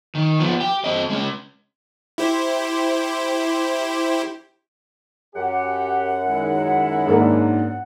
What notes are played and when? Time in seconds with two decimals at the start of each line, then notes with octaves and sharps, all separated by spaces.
0.15 D#3
0.40 F3 B3
0.60 G4
0.84 C4 D#5
1.10 G#3 C#4
2.18 E4 G4 C5
5.36 F#2 G4 F#5
6.26 D#3 G#3 E4
7.07 G#2 A#3 D4